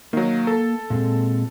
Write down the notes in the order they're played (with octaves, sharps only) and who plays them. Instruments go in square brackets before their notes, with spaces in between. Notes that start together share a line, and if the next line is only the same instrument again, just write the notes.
[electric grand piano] D#3 F#3 [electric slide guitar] A#3
[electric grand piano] A4
[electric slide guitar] A#2 G#3 C4